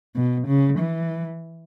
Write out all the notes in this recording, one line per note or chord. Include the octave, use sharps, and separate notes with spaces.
B2
C#3
E3